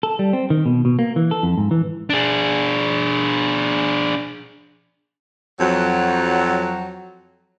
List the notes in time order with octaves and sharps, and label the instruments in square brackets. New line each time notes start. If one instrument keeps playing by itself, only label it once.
[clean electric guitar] A4
G3
C4
D#3
B2
B2
A#3
E3
A4
F2
G#2
E3
[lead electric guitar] D4 G#4
[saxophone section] F2 F#3